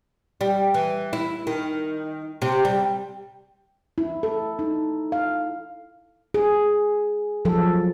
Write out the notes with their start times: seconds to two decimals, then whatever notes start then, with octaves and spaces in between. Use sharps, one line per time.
0.41 G3
0.74 E3
1.13 E4
1.47 D#3
2.42 C3
2.65 G3
3.98 E4
4.23 A4
4.59 D#4
5.12 F5
6.34 G#4
7.45 F3 F#3 A4